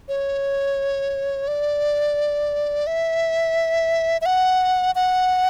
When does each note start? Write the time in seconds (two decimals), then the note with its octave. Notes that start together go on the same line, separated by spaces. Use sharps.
0.08 C#5
1.48 D5
2.87 E5
4.21 E5
4.26 F#5
4.95 F#5